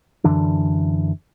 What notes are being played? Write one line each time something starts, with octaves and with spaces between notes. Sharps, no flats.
F#2 D3 E3 D4